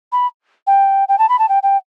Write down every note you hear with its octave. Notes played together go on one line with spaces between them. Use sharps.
B5
G5
G5
A5
B5
A5
G5
G5